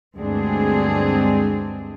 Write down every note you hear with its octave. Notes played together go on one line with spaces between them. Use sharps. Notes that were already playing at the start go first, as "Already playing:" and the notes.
D2 G2 G#3 C4 D4 G#4